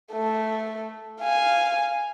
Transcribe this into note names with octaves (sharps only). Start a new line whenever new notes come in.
A3
F5 G#5